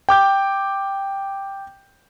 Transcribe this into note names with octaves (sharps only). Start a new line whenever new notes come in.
G5 D6 G6